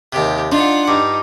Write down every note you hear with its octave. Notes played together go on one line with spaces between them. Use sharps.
D#2 C3 G4
D4 D#4 F4 D5 F#5 C6
G2 D#4 D6